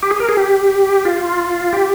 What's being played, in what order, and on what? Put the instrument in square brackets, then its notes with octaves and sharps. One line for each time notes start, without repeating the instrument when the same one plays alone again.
[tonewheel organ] G4
G#4
A#4
G#4
G4
F4
G4